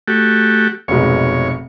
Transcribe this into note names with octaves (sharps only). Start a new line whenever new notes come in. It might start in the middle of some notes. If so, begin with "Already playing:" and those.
A3 F#4 G4
F1 G#2 B2 C#5